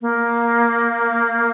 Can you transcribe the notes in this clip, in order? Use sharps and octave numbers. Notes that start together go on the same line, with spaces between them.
A#3